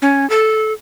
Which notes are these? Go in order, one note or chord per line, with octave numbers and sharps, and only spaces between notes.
C#4
A4